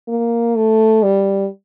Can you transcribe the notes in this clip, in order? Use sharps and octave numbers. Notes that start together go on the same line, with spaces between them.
A#3
A3
G3